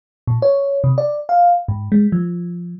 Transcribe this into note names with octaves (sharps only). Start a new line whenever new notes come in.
A#2
C#5
C3
D5
F5
G#2
G#3
F3